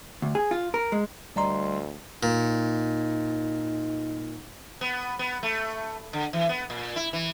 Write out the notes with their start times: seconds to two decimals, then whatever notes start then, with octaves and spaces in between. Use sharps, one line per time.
0.22 D2
0.35 G#4
0.51 F4
0.74 A#4
0.92 G#3
1.36 D2 G3 D5 D#5 A#5 C6
2.23 A#2 D#4
4.81 B3
5.19 B3
5.43 A3
6.13 D3
6.33 E3
6.49 B3
6.70 A#2
6.96 E4
7.13 E3